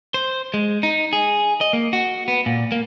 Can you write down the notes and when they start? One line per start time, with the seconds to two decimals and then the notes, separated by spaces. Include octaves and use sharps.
0.14 C5
0.54 G#3
0.83 D#4
1.13 G#4
1.61 D#5
1.73 A#3
1.93 F#4
2.28 B3
2.46 A#2
2.72 A#3